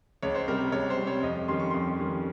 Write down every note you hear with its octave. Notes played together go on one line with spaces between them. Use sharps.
C#2 C#5
C5
C3 G3 A#4
C#2 C#5
C5
G3
C3 C#5
F2 D#5
D#3 G3 C#4 C6
C#6
F2 C6
D#3 G3 C#4